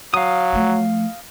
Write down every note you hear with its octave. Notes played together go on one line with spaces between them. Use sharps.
F#3 F5 D#6
F3 A3